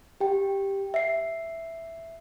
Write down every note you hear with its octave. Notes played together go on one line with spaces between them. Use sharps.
G4 G5
E5 C7